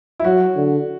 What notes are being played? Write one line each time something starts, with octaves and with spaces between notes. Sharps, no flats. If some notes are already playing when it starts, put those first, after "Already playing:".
E4
F#3 F#4
D3